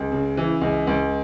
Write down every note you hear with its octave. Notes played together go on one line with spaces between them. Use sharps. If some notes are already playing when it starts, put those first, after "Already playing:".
Already playing: C#2
C#3
E3
C#2
C#2